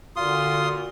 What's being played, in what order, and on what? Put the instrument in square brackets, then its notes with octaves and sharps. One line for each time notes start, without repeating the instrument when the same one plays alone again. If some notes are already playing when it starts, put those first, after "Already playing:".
[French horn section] A#2 F#4 [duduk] D3 [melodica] F4 [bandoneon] C6 D#6